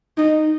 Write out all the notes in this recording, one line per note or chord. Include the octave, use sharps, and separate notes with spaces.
D#4